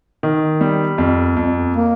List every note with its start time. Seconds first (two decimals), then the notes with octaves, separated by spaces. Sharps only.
0.23 D#3
0.61 G3
0.98 F2
1.36 F2
1.73 A#3